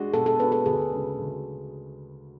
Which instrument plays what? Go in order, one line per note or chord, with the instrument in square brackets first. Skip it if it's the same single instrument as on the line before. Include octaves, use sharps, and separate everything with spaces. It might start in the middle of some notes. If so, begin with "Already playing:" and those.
Already playing: [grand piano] G#3 D4 F#4
[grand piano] B2 [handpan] A4
[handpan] A4
[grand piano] G#3 D4 F#4 [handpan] B4
[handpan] A4
[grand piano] D2 [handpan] G#4
[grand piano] C#3 G#3
D2